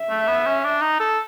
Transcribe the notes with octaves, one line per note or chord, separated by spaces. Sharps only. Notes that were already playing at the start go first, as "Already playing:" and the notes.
Already playing: E5
A3
B3
C#4
D4
D#4
A4